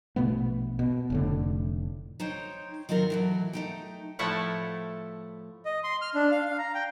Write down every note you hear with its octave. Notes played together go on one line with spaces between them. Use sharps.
A#1 B2 A3 B3
B2
F1 A2 D3
D#4 C5 C#5 G5
D#3 F#3 C4 F4 F#4 A#4
A2 E3 F#3
A3 D#4 G5
A2 F3 A3 E4 F#5
D#5
C6
F6
D4
F5
F5
A#5
G5